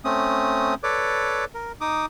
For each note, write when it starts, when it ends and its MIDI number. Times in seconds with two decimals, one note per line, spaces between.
0.05 0.74 57
0.05 0.74 60
0.05 0.74 61
0.05 0.74 87
0.83 1.45 69
0.83 1.45 71
0.83 1.45 73
0.83 1.45 74
0.83 1.45 86
1.54 1.72 70
1.81 2.06 63
1.81 2.06 86
1.81 2.06 87